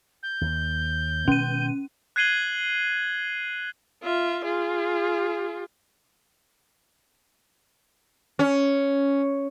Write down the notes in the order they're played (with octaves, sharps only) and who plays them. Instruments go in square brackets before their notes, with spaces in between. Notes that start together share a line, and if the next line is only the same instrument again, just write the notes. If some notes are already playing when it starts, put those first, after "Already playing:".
[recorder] G6
[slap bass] D#2
[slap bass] B2 D#3 G#3 [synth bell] C#4 D#7
[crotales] F#6 G#6 C7 D#7 F#7 G7
[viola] F4 E5
F4 G#4
[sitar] C#4